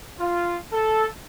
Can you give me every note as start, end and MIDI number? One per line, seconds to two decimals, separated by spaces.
0.19 0.57 65
0.73 1.06 69